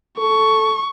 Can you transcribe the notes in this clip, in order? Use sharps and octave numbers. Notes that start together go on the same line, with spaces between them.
A4 C#6